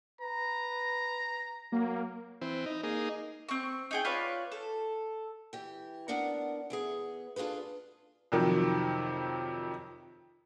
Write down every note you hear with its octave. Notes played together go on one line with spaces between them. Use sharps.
B4 A#5
F#3 A#3
E3 C4
D#4
A#3 D#4 G#4
C4 C#6
D#4 G#4 G5
F4 B4 C#5 D5
A4
E3 G4
B3 D4 A#4 D5 F#5
E3 B3 G#4
D4 F4 G#4 A4 B4
F2 C3 D#3 F3 F#3